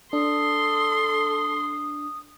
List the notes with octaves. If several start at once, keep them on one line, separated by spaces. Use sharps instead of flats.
D4 A4 C6 D#6